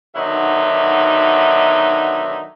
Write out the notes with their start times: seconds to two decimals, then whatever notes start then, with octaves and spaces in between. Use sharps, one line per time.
0.15 B2 D3 D#3 F#3 D#4 E5